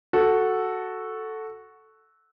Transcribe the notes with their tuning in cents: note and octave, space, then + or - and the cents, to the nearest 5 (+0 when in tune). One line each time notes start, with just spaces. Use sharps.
F#4 +0 A4 +0